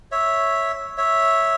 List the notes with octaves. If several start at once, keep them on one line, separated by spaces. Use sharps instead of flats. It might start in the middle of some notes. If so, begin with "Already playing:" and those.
C#5 E5
C#5 E5